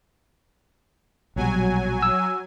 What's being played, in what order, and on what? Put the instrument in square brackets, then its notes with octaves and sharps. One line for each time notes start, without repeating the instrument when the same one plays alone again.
[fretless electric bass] A#1 B2 G3 [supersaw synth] F#3 G#5
[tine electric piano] E6